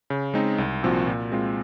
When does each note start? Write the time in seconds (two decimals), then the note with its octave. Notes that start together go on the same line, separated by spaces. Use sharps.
0.10 C#3
0.34 G#3 C4 D#4
0.58 C2
0.83 A#2 F3 C4 F#4
1.07 A#2
1.32 G#3 C4 F4